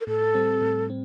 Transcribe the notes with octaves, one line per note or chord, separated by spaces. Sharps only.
A#4
A2 A4
G3 C4
A2
C4